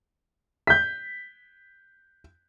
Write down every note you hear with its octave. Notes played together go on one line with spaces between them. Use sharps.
G6 B6